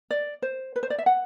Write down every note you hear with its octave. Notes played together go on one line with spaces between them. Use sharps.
D5
C5
B4
C5
D5
E5
F#5